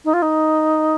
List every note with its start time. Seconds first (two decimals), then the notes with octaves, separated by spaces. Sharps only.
0.05 D#4
0.13 F4
0.22 D#4